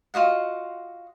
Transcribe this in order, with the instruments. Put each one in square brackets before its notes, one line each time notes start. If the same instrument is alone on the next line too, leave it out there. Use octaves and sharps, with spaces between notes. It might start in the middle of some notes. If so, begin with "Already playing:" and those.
[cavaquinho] F4 F#4 D#5 F#5